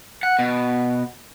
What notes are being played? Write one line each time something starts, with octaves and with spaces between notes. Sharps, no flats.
F#5
B2